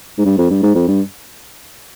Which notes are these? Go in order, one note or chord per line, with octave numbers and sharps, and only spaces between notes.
G#2
G2
F2
G2
G#2
F2
G2